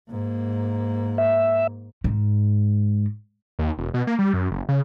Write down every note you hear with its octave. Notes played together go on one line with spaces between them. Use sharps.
G#2 A#3
E5
G#2
D#2
E1
B2
A#3
G3
F#2
F#1
C#3